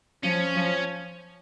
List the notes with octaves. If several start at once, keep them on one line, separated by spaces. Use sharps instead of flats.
F3 C#4
F3